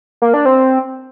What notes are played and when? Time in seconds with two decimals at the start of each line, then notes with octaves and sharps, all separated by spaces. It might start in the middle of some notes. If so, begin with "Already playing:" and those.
0.22 A#3
0.34 D4
0.46 C4